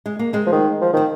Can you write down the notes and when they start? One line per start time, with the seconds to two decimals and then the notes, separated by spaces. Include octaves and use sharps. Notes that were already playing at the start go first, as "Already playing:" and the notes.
0.06 G#3
0.19 A#3
0.33 G#3 C4
0.46 F3
0.52 D#3
0.81 F3
0.93 D#3 C4